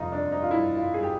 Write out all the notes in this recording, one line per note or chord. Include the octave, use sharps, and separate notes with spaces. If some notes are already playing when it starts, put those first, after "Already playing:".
Already playing: F2 C3 F3 D#4 F4
D4
D#4
F4
E4
F4
G#4
G4